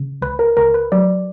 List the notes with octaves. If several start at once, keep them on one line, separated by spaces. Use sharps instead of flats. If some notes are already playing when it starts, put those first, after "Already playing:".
Already playing: C#3
C#2 B4
A#4
C#2 A#4
B4
F#3 D5